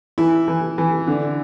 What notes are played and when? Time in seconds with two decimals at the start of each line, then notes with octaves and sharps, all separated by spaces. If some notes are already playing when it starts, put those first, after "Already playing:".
0.18 E3 E4
0.48 E3
0.78 E3
1.08 D3